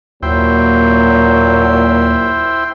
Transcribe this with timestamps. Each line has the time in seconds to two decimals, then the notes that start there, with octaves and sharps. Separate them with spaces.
0.23 D#2 A#2 F#3 E4 C5 G5